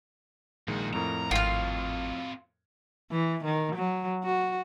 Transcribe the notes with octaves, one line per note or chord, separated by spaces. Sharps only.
A#1 A#2 D#3 G#3 F#4
F2 A2 A#4 A#5
G#1 C4 F4 F#4 F5
E3
D#3
F#3
F#4